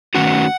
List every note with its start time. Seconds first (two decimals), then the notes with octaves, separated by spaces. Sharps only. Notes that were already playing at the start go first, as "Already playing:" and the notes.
0.15 D#3 A3 C#4 F#4 F#5